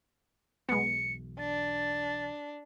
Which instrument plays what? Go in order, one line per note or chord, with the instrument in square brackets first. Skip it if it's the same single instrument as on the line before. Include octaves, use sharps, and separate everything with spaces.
[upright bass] B1 E2 [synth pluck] G#3 B3 [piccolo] C#7
[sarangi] D4 [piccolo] A6